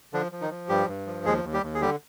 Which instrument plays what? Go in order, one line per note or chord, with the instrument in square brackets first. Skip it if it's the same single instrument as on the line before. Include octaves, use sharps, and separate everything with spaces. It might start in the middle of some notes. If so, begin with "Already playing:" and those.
[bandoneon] D3 F3 D4
F3
D#3 D#4
F3
G2 G3 G4
G2
F3
D#2 G#3 G#4
D#2
G3 G4
D#2
G#4
D3 G3 G4